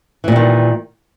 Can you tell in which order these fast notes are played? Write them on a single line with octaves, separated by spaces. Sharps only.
E3 A#2 G3 D#3